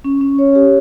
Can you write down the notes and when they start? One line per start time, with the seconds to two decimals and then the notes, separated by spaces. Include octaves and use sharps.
0.04 C#4
0.21 C#4
0.39 C#5
0.55 G4